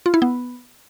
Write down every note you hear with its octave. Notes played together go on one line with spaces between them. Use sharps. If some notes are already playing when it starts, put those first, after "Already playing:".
F4
E4
B3